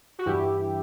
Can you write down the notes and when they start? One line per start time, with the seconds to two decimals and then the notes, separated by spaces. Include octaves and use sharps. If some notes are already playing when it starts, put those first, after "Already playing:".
0.19 F#4
0.26 G2 E3 E4 G4